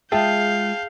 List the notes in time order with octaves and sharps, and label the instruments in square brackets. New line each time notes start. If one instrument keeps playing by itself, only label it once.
[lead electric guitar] G#3 F4 [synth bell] G#4 [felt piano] E5 G5 A5 [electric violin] F5 G6